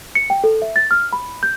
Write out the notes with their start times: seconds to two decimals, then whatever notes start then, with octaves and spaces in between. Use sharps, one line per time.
0.15 C#7
0.30 G5
0.44 A4
0.62 E5
0.76 A6
0.91 F6
1.13 B5
1.43 G6